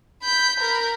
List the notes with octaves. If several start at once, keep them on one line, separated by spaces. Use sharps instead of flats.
B5 G6
A#4 B5